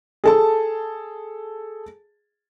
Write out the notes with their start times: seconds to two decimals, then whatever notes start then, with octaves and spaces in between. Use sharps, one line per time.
0.24 G#4 A4 A5